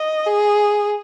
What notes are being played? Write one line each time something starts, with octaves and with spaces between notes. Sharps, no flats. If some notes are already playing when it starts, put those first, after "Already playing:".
Already playing: D#5
G#4